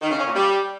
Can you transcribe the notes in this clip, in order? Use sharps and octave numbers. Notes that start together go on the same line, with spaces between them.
D#3
C#3
C#4
A#2
G3